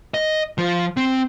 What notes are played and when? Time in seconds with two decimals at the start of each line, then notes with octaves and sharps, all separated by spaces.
0.14 D#5
0.58 F3
0.97 C4